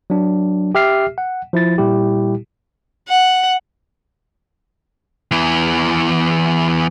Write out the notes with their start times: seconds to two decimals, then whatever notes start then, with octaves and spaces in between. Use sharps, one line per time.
0.10 F#3 D4
0.75 G4 E5 F6 C7
1.18 F#5
1.53 F3 E4 A6
1.78 A#2 G3 E4 G4
3.08 F#5
5.31 E2 E3